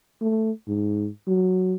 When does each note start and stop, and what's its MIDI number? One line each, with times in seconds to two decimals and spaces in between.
0.22 0.51 57
0.68 1.09 44
1.27 1.76 54